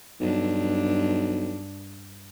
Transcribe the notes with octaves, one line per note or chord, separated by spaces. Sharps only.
B1 G2 D4